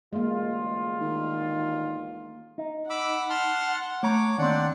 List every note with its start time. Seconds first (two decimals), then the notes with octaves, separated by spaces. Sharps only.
0.13 A1 D2 G#3 A#3 F4
1.01 D#3
2.58 D#4
2.90 F#5 B5 D6 E6
3.30 A5 C6 F6
4.03 A3 C#5 A#5 D6
4.38 D#2 C4 D4 D5 F#5